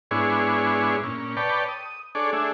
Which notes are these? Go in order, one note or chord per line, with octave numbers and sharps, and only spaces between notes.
G#2 B3 D4 E4 G#4 C#5
A#2 C#4
B4 C#5 D5 G5 A5
D#6
D4 G#4 A4 C#5 D5
A3 D4 G#4 E5